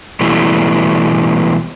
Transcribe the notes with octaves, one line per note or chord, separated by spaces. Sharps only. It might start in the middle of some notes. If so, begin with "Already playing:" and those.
B2 E3 G3 A3